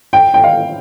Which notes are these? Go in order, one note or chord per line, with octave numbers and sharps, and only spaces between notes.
G5
G5
F5